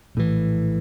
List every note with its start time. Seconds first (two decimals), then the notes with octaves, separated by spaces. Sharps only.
0.15 A#1 A2 E3